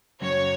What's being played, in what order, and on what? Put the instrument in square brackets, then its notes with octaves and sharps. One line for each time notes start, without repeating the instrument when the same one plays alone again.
[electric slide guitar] F#2 C#3 F#3 A#3 [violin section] C#5